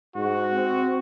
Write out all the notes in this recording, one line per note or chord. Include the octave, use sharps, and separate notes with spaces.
G#2 F#4
C4